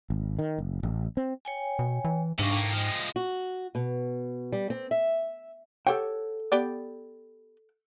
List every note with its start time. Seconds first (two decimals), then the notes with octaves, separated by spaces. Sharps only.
0.10 G#1
0.39 D#3
0.58 F#1
0.83 A1
1.17 C4
1.45 C#5 G5 G#5
1.79 B2
2.04 E3
2.39 G#2 C3 G#3 D4 F5 C#6
2.52 A2 A#3 G5
2.74 F3 G#3
3.16 F#4
3.75 B2
4.52 G3
4.70 C4
4.91 E5
5.87 G4 A4 C#5 F#5 G5
6.52 B3 G4 D5